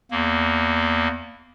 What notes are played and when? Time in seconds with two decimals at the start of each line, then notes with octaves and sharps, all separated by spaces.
0.11 E2 A#3